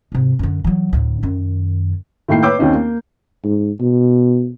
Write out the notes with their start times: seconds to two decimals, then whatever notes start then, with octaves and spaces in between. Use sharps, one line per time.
0.12 G#2 C3
0.39 F#2 D3
0.64 E3 F#3
0.93 D2 A2
1.23 F#2 D#3
2.28 A2 D#3 A#3 G5 C7
2.43 B4 C#5 D6 E6 G6
2.59 D#2 C4 C#4 D#4
2.74 A#3
3.44 G#2
3.81 B2